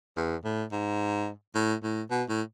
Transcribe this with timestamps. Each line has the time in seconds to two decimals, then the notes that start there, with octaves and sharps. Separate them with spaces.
0.17 E2
0.45 A2
0.72 G#2
1.55 A2
1.83 A2
2.11 B2
2.29 A2